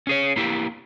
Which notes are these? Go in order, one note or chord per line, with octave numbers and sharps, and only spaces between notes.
C#4 G#4 C#5
A#3 E4 G4